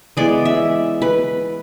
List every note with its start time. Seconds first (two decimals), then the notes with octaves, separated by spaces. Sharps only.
0.17 E3 G#3 B3 D5
0.45 E5
1.02 B4